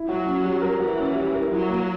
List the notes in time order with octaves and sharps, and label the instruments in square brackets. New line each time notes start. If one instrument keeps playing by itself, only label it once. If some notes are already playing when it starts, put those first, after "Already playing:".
Already playing: [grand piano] E4
[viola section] F#3 [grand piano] F#4
[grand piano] C#4
G3
A#4
[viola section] E3 [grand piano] F#4
[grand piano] C#4
G3
A#4
[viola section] F#3 [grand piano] E4
[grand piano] A#3